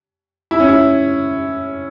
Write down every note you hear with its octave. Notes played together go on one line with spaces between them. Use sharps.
E4
C#4
E4